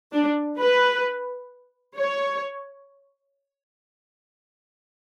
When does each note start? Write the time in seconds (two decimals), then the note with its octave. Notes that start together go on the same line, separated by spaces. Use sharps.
0.13 D4
0.59 B4
1.98 C#5